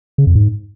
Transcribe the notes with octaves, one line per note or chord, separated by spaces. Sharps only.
C#3
F2
G#2